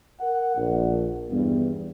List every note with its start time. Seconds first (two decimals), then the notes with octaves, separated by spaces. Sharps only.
0.21 A#4 F#5
0.56 A#1
1.31 E2 G2 B3